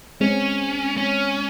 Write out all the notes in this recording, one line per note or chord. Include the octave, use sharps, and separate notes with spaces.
G#3 C4 C#4
C#4